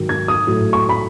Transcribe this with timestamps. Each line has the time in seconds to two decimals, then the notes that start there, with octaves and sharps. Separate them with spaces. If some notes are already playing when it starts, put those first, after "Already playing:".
Already playing: G#2 D#3 F#3
0.09 G#6
0.28 D#6
0.47 A2 F#3
0.73 C#6
0.89 B5